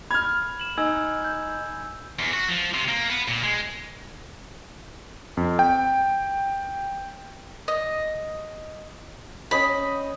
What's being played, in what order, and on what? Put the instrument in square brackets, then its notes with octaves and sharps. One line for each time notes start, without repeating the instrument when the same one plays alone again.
[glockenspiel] B5 [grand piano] F6 G#6
[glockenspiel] E7 F#7
[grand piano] D#4 [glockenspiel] G#5 E6 G#6
[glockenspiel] G6
[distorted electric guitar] E2
F#4
F3
C3
A#3
B3
A#2
G#3
[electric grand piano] F2
G5
[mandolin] D#5
[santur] C#4 D#5 G5 [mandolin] B5